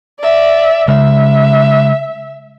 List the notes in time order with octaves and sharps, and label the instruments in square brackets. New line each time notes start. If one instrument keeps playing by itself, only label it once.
[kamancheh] D5 E5
[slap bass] C#3 G#3 [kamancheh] E5